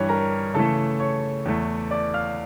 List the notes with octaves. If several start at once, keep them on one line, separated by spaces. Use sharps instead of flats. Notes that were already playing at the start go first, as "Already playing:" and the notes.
Already playing: G2 E3 G3 C#5 C#6
A#4 A#5
C#3 E3 A3 A4 A5
C#5 C#6
E2 E3 A3
D5 D6
F5 F6